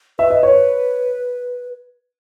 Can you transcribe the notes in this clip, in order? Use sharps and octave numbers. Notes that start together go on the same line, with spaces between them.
B4 E5
D#5
C#5